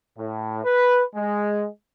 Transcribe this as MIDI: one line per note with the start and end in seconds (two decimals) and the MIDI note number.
0.18 0.63 45
0.65 1.02 71
1.15 1.66 56